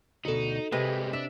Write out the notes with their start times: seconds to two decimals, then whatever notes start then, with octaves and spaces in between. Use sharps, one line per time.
0.25 D2 B2 D#4 F#4 A4
0.72 C3 G3 G#3 B4 D#5
1.13 D4 E5